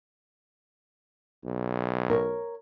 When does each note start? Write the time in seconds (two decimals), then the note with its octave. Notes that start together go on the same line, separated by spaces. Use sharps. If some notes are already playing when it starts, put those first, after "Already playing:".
1.45 B1
2.10 A#4 C#5